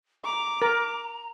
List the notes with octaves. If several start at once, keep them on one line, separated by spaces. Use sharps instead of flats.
A#5 D6
A#4